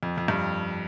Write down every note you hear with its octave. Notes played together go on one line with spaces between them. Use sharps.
F2
F2
G2